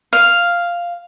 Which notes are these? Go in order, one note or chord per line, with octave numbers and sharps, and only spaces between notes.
F5